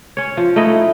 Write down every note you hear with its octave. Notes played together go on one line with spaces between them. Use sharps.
C#4 C#5
F3
A3 D#4 E4 D#5